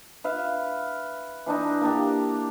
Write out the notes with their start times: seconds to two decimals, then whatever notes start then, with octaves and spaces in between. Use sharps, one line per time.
0.24 B4 E5 F5
1.46 E3 D4 D#4
1.81 A#3 D4 G4